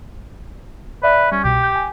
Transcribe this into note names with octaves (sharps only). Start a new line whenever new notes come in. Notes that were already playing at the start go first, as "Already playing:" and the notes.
B4 D5 E5
G3 C#4
C2 B2 G4
G6
G#5